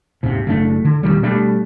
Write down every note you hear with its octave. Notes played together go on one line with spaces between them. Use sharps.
D#1 G#1 C3
F#1 A3 D4
D3
D#1 A2 D#3 G3
B2 G3 A3 D4